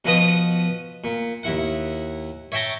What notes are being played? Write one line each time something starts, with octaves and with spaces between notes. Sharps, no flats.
B2 F3 B3 B4 D#5 D#6
A#2
D#2 E4 F#5
C#5 E5 G5 A5 A#5